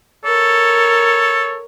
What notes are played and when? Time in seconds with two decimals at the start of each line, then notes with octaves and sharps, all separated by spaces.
0.25 A4 A#4 C#5